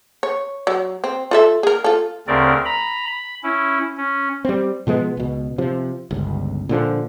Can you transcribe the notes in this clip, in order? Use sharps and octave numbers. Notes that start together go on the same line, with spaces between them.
C#5
F#3
C4
F4 A4 E5
G#4 A#4
F4 A4
D2 C#3 C4 A#4 D5
A#5 B5
B5
C#4 E4
C#4
G3 C4
B2 F3 G#3 B3
C#2 B2
C3 F3
G1 C#2
A#2 D3 F3